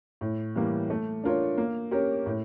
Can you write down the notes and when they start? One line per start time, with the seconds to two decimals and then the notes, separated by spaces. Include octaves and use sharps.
0.21 A2
0.56 E3 G3 A#3
0.90 A3
1.24 D4 F4 A#4 C#5
1.58 A#3
1.91 C#4 G4 A#4 C#5
2.26 A2